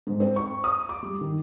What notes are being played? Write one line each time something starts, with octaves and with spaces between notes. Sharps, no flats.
G#2
C4
C#6
D#6
D6
G3
D#3